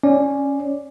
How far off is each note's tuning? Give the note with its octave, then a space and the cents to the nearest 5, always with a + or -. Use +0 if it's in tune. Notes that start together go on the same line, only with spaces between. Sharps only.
C#4 +0 D5 +0